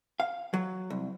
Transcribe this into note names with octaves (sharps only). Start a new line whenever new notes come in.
F5
F#3
C2